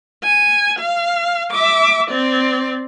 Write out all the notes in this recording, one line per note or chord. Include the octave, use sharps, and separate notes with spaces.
G#5
F5
E5 D6
C4 D5